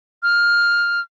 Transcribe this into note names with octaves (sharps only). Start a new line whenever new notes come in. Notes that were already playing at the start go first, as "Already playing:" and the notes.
F6